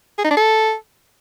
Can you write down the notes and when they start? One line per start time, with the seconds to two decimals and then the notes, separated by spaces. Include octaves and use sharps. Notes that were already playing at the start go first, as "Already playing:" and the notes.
0.18 G#4
0.24 D#4
0.31 D4
0.37 A4